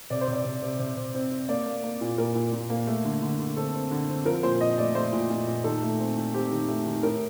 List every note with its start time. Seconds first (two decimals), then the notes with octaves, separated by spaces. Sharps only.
0.10 C3 D5
0.21 C5
0.28 C3
0.33 D5
0.45 C3
0.62 C3
0.79 C3
0.97 C3
1.14 C4
1.31 C4
1.49 A#3 D5
1.66 A#3
1.83 A#3
2.01 A#2
2.18 A#2 A#4
2.35 A#2
2.52 A#2
2.70 A#3
2.87 A3
3.05 D3
3.22 D3
3.39 D3
3.56 C4 A4
3.74 C4
3.91 D3
4.09 C4
4.25 F3 A#4
4.43 A#2 C5
4.61 A#2 D#5
4.78 A3 D5
4.95 A3 C5
5.13 A#2
5.30 A#2
5.47 A#2
5.64 D#3 A4
5.82 A3
5.99 C4
6.16 D#3
6.34 C4 G4
6.51 D#3
6.68 A3
6.86 D#3
7.03 A2 A#4